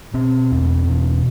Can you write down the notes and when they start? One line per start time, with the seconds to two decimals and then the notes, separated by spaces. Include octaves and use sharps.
0.14 B2 C4
0.51 E2
0.88 B2